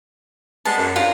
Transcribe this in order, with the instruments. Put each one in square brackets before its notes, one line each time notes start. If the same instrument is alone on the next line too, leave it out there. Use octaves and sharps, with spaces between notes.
[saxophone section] G3 G#3 B3 [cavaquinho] A5
[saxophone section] F#2
[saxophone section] G2 A#4 [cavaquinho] F4